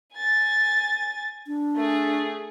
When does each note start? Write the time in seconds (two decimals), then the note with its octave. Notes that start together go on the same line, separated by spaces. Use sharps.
0.14 G#5 A6
1.47 D4
1.76 A3 G#4